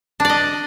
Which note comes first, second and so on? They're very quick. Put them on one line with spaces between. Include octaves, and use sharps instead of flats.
D4 D5 D#5